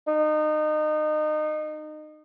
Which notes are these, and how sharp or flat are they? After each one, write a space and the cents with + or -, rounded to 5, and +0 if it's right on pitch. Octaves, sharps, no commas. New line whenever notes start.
D#4 -25